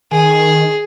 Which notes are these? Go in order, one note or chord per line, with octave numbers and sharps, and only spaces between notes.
D#3 G#4 G#5